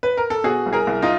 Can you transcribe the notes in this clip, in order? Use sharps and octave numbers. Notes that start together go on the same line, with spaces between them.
B4
A#4
A4
B2 F#4 G#4
C2
G#4 A#4
C2
D#4 F4